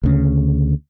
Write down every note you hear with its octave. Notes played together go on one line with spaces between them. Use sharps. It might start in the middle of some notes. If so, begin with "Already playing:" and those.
D2 C#3